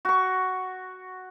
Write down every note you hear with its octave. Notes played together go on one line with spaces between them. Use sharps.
F#4 C#6